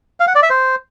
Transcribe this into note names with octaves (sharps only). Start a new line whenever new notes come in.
F5
F#5
D5
E5
C5